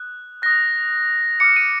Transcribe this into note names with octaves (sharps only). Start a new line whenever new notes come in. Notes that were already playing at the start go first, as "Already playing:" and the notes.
Already playing: D#6 F#6
D#6 F#6 A#6
D6 F6 C#7
D#7